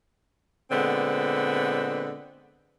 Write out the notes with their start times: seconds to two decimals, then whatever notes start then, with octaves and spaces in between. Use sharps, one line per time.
0.70 A#2 D3 G#3 B3 C4